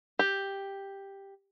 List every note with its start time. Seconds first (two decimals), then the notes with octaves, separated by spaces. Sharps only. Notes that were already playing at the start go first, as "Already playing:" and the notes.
0.19 G4